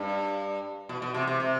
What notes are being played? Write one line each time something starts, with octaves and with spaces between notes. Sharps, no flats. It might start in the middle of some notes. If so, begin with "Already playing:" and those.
Already playing: G2
B2
B2
C3
C3
C3